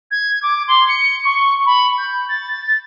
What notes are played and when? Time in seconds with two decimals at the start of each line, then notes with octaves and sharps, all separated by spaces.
0.11 G#6
0.42 D6
0.67 C6
0.88 C#7
1.25 C#6
1.66 B5
1.98 G6
2.28 A6